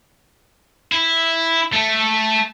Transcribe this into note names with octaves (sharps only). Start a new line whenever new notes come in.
E4
A3